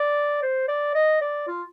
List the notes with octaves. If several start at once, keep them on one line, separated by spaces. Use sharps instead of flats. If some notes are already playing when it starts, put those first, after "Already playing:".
Already playing: D5
C5
D5
D#5
D5
F4